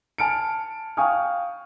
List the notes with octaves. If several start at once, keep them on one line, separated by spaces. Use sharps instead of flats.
G#5 A5 F6 C#7 D7
F5 G5 G#5 C#6 D#6 F6